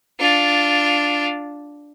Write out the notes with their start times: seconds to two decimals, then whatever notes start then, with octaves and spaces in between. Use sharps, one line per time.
0.20 D4 F4